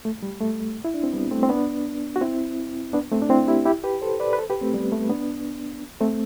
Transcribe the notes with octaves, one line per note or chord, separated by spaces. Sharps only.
A3
G3
A3
E4
D4
C4
G3 B3
A3 C4
C4
B3 D4
F#4
C4 E4
B3 D4
A3 C4
D4
C4 E4
E4 G4
E4 G4
G4 B4
A4 C5
B4 D5
B4
A4 C5
G4 B4
A3 C4
G3 B3
A3
B3 D4
A3 C4